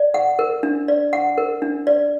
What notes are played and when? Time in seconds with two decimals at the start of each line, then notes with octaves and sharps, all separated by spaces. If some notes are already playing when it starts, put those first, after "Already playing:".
Already playing: D5
0.14 F#5
0.39 A#4
0.63 D4
0.88 D5
1.13 F#5
1.38 A#4
1.62 D4
1.87 D5